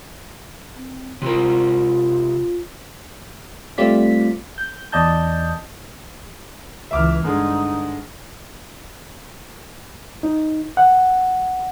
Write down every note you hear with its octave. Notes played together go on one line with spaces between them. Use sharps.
C4
C3 F4 A#4
G3 A3 C4 F4 D5 B6
G6
E2 D5 D#5 A5 G6
C#2 E3 E5 D6 F6
G2 D3 G#3 D#4
D#4
F#5